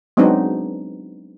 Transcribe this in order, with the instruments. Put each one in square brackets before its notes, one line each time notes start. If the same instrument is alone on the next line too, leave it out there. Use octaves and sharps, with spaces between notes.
[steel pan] F#3 G#3 B3 C4 D4 D#4